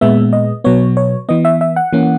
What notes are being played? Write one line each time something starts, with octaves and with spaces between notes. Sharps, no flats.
A#2 G#3 B3 E5
D#5
B2 F#3 B3 C#5
C#5
E3 B3 D#5
E5
E5
F#5
E3 A#3 C#4